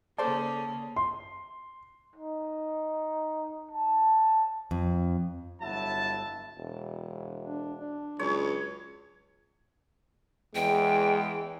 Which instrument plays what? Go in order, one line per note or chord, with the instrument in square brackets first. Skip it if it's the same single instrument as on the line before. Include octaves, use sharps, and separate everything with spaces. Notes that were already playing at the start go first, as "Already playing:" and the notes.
[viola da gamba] C#3 A#3 C#4 [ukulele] A4 C5 D5 [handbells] A5
[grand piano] C6
[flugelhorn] D#4
A5
[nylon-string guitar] F2
[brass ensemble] G1 F#3 E4 A5
[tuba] E1
[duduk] D4
D4
[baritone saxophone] C#2 [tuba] F#3 [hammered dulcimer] C#5
[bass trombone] E2 [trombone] G#3 [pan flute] G5